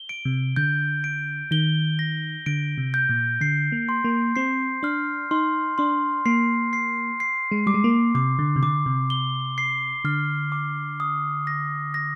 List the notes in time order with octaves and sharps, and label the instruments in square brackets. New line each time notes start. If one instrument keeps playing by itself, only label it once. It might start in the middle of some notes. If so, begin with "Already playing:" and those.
Already playing: [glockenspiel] G7
D7
[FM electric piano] C3
[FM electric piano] D3 [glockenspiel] G6
[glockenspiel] D7
[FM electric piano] D#3 [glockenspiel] G7
[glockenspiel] A#6
[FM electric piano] D3 [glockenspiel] D7
[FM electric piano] C3
[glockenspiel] G6
[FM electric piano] A#2
[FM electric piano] D3 [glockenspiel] C7
[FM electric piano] A#3
[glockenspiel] C6
[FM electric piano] A#3
[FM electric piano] C4 [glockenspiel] C7
[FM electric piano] D4 [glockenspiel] F6
[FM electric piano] D#4 [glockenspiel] C6
[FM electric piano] D4 [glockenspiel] C6
[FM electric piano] A#3 [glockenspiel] C7
[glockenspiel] C7
C7
[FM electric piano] G#3
[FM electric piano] G3 [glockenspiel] D6
[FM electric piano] G#3
A#3
[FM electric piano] C3 [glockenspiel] D6
[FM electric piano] D3
C3
[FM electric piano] D3 [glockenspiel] D6
[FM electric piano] C3
[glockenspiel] G7
C7
[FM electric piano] D3 [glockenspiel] F6
[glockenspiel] D6
D#6
A#6
A#6